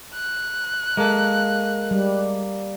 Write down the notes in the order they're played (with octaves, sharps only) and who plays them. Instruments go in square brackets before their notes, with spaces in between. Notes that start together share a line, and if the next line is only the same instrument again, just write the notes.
[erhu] F#6
[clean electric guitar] G#3 A4 [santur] A#3
[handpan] G3